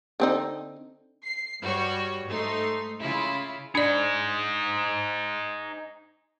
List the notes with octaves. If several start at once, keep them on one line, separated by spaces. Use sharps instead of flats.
D3 C4 D#4
C7
G2 G3 F#4 C#5
G#2 A3 D#4 C6
C#3 E4 F4
D4 D#4 G#4 D5